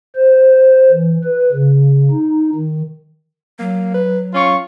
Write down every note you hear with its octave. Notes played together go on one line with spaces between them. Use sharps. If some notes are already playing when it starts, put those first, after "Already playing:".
C5
E3
B4
C#3
D#4
D#3
F#3 A#3
B4
C#4 F4 F5 C#6